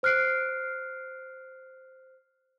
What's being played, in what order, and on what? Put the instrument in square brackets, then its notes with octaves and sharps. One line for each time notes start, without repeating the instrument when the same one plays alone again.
[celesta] C5 F6 F#6 C7 D7